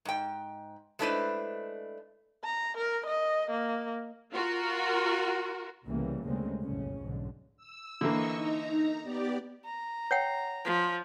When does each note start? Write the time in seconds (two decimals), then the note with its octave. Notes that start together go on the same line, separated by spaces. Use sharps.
0.05 G#2 G5
0.99 G#3 A3 D4 E4 B4 C5
2.44 A#5
2.78 A#4
3.07 D#5
3.51 A#3
4.32 F4 F#4 A#4
5.85 C2 C#3 E3 G3 A#3 B3
6.24 D2 C#3 G3 G#3 A#3 C4
6.61 F#1 B1 F2 A2 C#3 C#4
7.00 B1 G#2 D3
7.57 E6
8.01 D3 E3 A#3 D#5 C#6 E6
8.36 D#4 A#5
9.03 B3 G4 D5
9.65 A#5
10.11 C#5 F#5 G5
10.65 F3